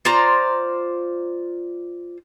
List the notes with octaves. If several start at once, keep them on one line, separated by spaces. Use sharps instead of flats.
F4 C5 D5 A#5